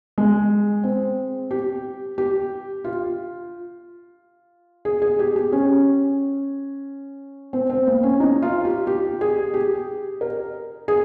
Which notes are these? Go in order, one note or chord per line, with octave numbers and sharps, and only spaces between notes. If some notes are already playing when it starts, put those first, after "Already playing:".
G#3
C4
G4
G4
F4
G#4
G#4
G4
G4
C#4
C4
C4
A#3
C#4
D#4
F4
G4
G4
G#4
G4
A#4
G#4